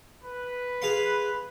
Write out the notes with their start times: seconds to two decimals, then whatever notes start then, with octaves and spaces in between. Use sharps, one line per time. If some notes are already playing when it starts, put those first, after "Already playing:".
0.25 B4
0.82 G#4 F5 C6